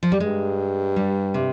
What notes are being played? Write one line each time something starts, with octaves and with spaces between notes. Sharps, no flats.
F3
G3
G2 G#3
G3
C3